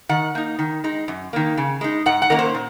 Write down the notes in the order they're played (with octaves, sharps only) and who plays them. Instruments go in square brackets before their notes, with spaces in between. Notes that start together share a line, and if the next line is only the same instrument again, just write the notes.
[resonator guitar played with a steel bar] D#3 F#5
A#3 D#4
D#3
G#3 D#4
F#2
D#3 A#3
C#3
G#3 D#4
G#2 F#5
F#5
D#3 A#3 C#4 A#4
C5
A#2